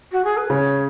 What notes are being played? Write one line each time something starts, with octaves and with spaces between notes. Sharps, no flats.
F#4
G#4
B4
C#3 C#5